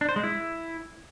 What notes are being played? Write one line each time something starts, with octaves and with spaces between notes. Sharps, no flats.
D4
C5
G#3
E4